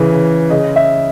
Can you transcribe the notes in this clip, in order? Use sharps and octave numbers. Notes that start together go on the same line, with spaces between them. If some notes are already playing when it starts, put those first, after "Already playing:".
Already playing: C#3 E3
C#3
C#3 D#5
E5